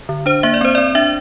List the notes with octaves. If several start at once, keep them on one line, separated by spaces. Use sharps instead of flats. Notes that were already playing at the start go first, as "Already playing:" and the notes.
D3
D4 C5
A#3 E5
D5
C4 C5
D5
C4
D4 E5